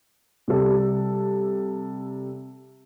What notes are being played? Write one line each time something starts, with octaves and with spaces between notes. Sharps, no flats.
C3 G3 A4